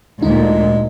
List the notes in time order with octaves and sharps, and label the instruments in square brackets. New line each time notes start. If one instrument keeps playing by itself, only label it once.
[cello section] D2 A#2 [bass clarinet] G#3 [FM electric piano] D#4